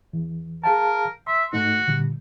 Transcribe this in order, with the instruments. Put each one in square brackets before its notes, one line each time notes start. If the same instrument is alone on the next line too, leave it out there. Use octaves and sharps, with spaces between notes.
[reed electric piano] E2
[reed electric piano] G#4 F5 A5 [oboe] A#4
[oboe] E5 [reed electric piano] C6
[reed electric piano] G#2 A3 D#4 [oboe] F#4
[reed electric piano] A#2 D3 G3